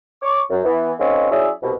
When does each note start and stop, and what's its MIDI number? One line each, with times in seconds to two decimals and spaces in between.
0.22 0.41 73
0.22 0.41 85
0.22 0.41 86
0.50 0.62 42
0.65 0.93 52
0.65 0.93 59
0.99 1.29 56
0.99 1.29 58
0.99 1.29 60
0.99 1.29 61
0.99 1.29 63
1.31 1.51 54
1.31 1.51 61
1.31 1.51 64
1.31 1.51 68
1.31 1.51 74
1.31 1.51 76
1.62 1.72 36
1.62 1.72 47